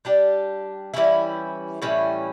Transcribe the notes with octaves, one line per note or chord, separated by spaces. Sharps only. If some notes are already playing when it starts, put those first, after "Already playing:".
G3 D4 G4
E3 G3 C#4 E4
A2 E3 G3 C#4